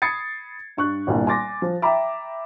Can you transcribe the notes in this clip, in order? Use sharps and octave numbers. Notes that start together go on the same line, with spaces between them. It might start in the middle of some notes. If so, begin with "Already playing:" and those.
B5 D#6 G#6 A6 C7 C#7
G2 C#6 F#6
G1 C2 A#2
G#5 C6 D6 A6 A#6
F3
E5 G5 A#5 B5 D6